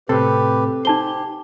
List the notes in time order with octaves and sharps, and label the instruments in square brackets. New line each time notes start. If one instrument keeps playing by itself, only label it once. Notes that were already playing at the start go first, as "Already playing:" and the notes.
[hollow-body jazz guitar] A2 C3 [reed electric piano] C4 A4 [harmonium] G4 B4
[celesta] D#4 A5 G7 [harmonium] G4 [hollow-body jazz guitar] C5